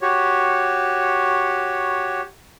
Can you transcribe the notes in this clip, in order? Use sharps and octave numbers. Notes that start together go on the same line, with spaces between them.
F#4 G4 C#5